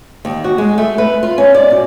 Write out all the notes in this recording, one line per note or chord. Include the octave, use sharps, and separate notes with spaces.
D#2
F#4
G#3
A3
B4
F4
C#4
D5
B2